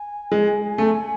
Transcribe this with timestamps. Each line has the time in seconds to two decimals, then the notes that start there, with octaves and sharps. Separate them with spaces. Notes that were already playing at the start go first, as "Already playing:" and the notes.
Already playing: G#5
0.32 G#3
0.78 A3